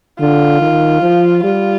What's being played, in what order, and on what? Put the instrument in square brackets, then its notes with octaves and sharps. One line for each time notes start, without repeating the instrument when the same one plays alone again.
[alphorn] D3 [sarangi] F4
[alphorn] D#3
F3
[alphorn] G3 [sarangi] F4